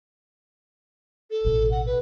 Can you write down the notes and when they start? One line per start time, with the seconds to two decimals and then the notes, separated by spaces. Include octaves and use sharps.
1.31 A4
1.44 A1 B2
1.71 F#5
1.86 B4